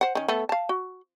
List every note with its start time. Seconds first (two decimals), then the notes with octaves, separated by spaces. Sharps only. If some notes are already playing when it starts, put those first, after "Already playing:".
0.01 C5 F#5
0.15 D#3 C#4
0.28 A3 B3 A4
0.49 F5 A5
0.69 F#4